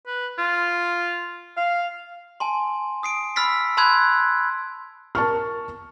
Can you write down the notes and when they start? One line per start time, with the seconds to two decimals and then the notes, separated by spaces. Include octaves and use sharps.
0.07 B4
0.38 F4
1.57 F5
2.40 G#5 A5 C6
3.03 D#6 C7 D7
3.36 B5 E6 F6 A6 B6 C7
3.77 A5 B5 C6 E6 F#6 G#6
5.15 A#4 A5 C#6 F6